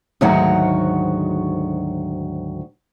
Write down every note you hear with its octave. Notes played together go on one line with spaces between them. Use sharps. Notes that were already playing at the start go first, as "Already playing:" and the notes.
D2 G#2 D#3 F#3 F#4